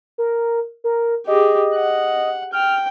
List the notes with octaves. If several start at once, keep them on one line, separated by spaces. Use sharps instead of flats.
A#4
A#4
G4 G#4 D#5
F#5
G5 F6